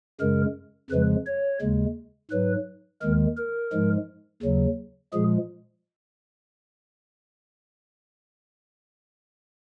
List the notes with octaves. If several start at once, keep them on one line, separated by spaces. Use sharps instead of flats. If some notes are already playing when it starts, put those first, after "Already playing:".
F#2 C#3 G#3 A#4
F2 C#3 F3 G#3 B4
C#5
D#2 C#3 G#3
G#2 F#3 B4
D#2 D#3 G#3 A#4
A#4
G#2 F3 G#3
D#2 C#3 F#3
A#2 F3 G#3 G#4